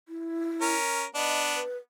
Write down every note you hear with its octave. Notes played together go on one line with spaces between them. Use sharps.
E4
C#4 A#4
B3 D4 D#5
B4